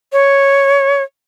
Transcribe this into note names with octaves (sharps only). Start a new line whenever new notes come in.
C#5